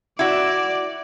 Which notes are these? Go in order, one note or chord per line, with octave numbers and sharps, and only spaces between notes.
E4 F#4 D5